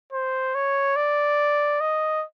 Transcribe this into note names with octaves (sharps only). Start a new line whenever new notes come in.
C5
C#5
D5
D#5